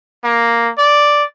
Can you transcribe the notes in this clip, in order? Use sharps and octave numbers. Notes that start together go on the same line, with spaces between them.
A#3
D5